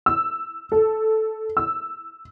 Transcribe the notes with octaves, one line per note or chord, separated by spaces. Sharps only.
E6
A4
E6